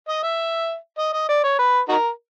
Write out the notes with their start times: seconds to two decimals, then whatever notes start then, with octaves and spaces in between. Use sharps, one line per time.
0.09 D#5
0.23 E5
0.98 D#5
1.13 D#5
1.29 D5
1.43 C#5
1.59 B4
1.89 D#4 F#4 A#4